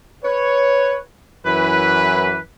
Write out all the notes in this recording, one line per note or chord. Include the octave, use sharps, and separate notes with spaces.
B4 C#5
F#2 E3 B4